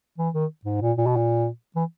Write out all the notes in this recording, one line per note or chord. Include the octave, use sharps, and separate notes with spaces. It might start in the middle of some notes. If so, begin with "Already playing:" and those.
E3
D#3
G#2
A#2
A#2
B2
A#2
E3